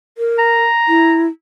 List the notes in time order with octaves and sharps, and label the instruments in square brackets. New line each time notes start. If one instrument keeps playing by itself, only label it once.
[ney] A#4
[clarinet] A#5
[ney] E4